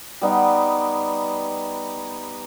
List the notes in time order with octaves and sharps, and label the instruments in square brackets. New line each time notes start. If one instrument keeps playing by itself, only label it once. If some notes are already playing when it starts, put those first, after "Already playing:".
[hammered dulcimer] G3 B3 D#4